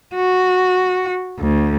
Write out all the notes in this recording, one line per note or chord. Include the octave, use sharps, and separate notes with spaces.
F#4
D2